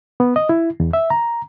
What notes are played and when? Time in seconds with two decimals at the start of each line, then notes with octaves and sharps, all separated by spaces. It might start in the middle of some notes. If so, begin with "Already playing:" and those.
0.20 B3
0.36 D#5
0.49 E4
0.80 E2
0.93 E5
1.10 A#5